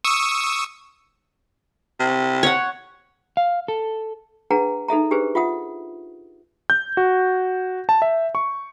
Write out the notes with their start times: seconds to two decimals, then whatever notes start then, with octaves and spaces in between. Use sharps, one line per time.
0.04 C#6 D#6 E6
1.99 C3
2.43 C#5 F#5
3.37 F5
3.68 A4
4.50 D4 G#4 B4 F#5 A#5
4.88 D#4 A4 E5 A#5
5.11 D4 G4 G#4 B4 C5
5.35 F4 E5 F#5 D#6
6.70 G6
6.97 F#4
7.89 A5
8.02 E5
8.35 C#6